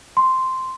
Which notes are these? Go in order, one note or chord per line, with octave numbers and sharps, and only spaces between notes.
C6